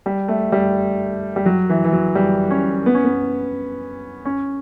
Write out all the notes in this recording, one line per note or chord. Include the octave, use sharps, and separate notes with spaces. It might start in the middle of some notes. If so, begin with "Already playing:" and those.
G3
A3
G3
G3
F#3
E3
E3
F#3
G3
C#4
B3
C#4
B3
C#4